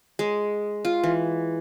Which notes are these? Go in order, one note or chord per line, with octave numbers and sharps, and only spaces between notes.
G#3
F4
E3